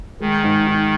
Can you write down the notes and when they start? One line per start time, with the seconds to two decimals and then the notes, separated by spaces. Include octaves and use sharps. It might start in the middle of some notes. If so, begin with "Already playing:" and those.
0.20 D#3 G#3
0.43 G#2
0.67 D#4